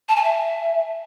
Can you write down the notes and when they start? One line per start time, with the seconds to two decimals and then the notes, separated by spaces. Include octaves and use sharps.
0.08 A5
0.16 G#5
0.23 E5